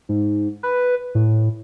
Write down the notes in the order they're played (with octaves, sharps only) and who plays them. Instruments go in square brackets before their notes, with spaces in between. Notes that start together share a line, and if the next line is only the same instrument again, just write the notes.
[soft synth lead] G#2
B4
A2